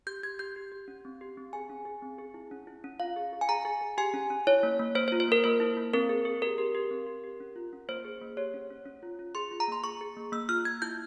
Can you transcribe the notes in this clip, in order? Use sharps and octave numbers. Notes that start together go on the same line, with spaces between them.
G4 G6
G4 G#6
G4 G6
G4
G4
C#4
C4
G4
C4
G#4 G#5
C#4
G#4
C4
G#4
E4
C#4
E4
C#4
F4 F5
G#4
G#4
G#5
G#4 A#5
G#4
G#4
G4 G#5
C#4
C#4
E4 C#5
A#3
A#3
A#3 C5
C5
F4
C5
A#3 A#4
A#3 C5
E4
A#3
C4 A#4
G#4
G#4
G4 A#4
G4
G4
C4
G4
G4
C#4
F4
C#4
A#3 C5
G#4
A#3
G4 C#5
C#4
C#4
C#4
F4
F4
G#4 C6
F4
A#5
A#3 C6
G#4 C#6
G#4
A#3
A#3 E6
F4 F6
A#3 G#6
E4 G6